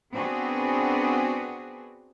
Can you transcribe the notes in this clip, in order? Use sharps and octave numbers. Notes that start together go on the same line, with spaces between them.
B3 C4 D4 F#4 G#4 B4